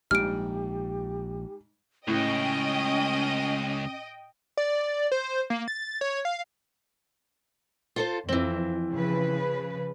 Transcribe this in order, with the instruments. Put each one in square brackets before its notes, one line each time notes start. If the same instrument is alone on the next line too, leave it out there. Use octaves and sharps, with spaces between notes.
[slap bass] A#1 [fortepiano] G#2 G3 [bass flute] G4 [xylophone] F6 D7
[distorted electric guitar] C#2 [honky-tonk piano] A2 [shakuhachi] C#4 [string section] D#5 G5
[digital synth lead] D5
C5
A#3
A6
C#5
F5
[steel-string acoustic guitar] F4 A4 C5
[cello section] F2 [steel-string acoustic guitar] E3 C4
[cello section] C#3 F3 B4